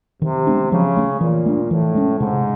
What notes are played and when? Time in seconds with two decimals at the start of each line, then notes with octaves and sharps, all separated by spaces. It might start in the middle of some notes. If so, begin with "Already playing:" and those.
0.22 C3 D#3
0.47 G#3 B3 D4
0.72 C#3 F3
0.97 A3 C#4
1.21 A#2 E3
1.46 A3 D4
1.71 A2 E3
1.95 G#3 C#4
2.20 G#2 C3